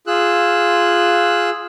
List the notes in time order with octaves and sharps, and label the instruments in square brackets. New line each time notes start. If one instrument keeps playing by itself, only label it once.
[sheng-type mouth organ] F4 G#4 E6 F#6